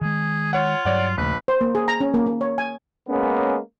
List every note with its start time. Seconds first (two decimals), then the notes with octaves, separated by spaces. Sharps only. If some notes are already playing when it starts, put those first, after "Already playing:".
0.01 D#3 G#3 G#4
0.53 F4 C#5 F#5
0.85 G2 F#3 C#5 D5 F#5
1.17 A#1 D#2 C#3 A3 B4
1.48 C5
1.61 A#3
1.75 G#4
1.88 A#5
2.00 C#4
2.14 A#3
2.26 A#3
2.41 C#5
2.58 G#5
3.08 G#3 A#3 B3 C#4